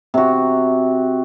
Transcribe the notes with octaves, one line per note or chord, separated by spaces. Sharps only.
C3 F#4